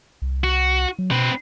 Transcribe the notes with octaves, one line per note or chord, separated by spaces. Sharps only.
C2
F#4
F#3
B2 C4 B4